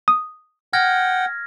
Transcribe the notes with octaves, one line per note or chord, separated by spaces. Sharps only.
D#6
F#5 G5 F6 G#6 A#6